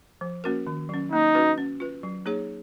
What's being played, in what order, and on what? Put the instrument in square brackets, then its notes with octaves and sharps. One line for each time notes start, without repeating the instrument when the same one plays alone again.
[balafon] F3
A#3 C#4 F#4 A#4
D#3
F#3 C#4
[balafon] A#3 [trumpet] D#4
[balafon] C#4 F#4 B4
C#4
F4 B4
F#3
A#3 D#4 G#4 C#5